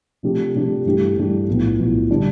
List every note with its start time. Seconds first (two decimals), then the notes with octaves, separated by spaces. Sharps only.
0.23 C3 F3 A3 D4 G4
0.55 C3 F3 A3 D4 G4
0.86 G2 E3 A3 D4 G4
1.17 G2 E3 A3 D4 G4
1.48 B1 A2 F3 B3
1.79 B1 A2 F3 B3
2.10 D3 G3 D4 G4